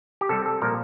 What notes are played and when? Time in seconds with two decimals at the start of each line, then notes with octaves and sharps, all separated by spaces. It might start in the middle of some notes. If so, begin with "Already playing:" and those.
0.21 G4
0.29 C3 G3 A4
0.46 A4
0.62 A#2 F3 A#4